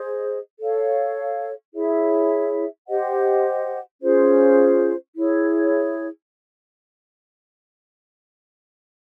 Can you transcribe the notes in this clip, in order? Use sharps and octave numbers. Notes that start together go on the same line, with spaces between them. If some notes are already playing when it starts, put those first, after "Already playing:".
Already playing: G#4 C5 D#5
A4 C#5 F5
E4 G#4 C#5 E5
G4 C5 D#5 F#5
C#4 F4 G#4 C5
E4 G#4 C#5